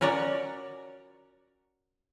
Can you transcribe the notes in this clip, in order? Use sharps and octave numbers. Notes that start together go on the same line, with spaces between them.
C#4 F#4 A#4 C#5 D5